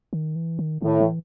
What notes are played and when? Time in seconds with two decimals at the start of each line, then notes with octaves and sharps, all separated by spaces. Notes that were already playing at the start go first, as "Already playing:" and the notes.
0.13 D#3
0.36 E3
0.59 D#3
0.82 A2 D#3
1.01 E3